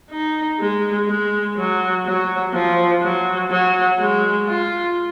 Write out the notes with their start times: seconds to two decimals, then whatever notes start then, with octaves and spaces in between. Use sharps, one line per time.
0.11 D#4
0.61 G#3
1.08 G#3
1.57 F#3
2.06 F#3
2.54 F3
3.02 F#3
3.51 F#3
3.99 G#3
4.49 F4